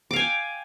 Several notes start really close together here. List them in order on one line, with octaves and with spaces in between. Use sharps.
D6 F5 G#5 G5